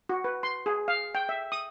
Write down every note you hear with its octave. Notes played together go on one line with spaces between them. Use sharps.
F#4
B4
C6
G#4
F5
G5
E5
D#6